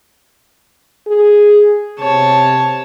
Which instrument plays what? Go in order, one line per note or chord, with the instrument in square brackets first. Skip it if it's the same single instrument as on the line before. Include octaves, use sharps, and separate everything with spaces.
[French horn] G#4
[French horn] C3 [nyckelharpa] C#5 A5